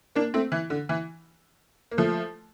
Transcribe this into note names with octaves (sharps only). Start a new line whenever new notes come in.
A#3 D4
A3 C4
E3
D3
E3
A#3
F3 A3